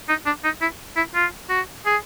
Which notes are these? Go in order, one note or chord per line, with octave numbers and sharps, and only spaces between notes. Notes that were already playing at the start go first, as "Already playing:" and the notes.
D#4
D4
D#4
E4
E4
F4
F#4
G#4